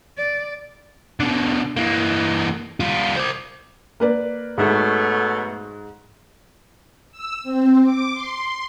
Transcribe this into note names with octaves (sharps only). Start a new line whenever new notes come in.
D5
B2 D3
E3 A#3
G3 F4
C5 D5
A#3 B4 D5
G#2 B2 F#3 A3
E6
C4
D6
C6